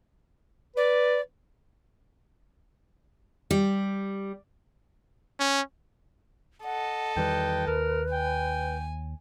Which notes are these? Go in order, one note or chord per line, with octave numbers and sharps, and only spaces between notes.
B4 D5
G3
C#4
A4 D#5 F#5
E2 D#3 G3 B4 G5
D#2 A#4
G5 G#5